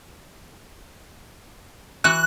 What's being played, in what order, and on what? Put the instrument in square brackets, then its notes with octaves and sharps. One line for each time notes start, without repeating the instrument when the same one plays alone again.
[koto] E3 F#4 [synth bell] F#6